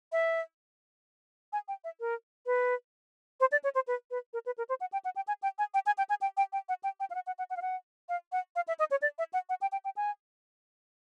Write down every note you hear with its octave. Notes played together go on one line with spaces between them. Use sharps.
E5
G#5
G5
E5
A#4
B4
C5
D5
C#5
C5
B4
B4
A#4
B4
A#4
C5
F#5
G5
F#5
G5
G#5
G5
G#5
G5
G#5
G5
G#5
G5
G5
G5
F#5
G5
G5
F5
F#5
F#5
F#5
F#5
F5
F#5
F5
F#5
F5
E5
D#5
C#5
D5
E5
F#5
F#5
G5
G5
G5
G#5